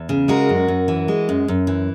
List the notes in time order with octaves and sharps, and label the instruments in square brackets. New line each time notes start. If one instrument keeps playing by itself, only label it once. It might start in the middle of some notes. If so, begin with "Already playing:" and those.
Already playing: [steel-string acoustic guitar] E2
C#3
G#3 F#4 A#4
F#2
F#2
E3
G#3
F#2
F#2
E3